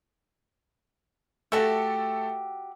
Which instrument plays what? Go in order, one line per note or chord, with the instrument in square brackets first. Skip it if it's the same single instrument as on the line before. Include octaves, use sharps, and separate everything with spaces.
[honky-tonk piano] A3 A4 [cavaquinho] F#4 G4 E5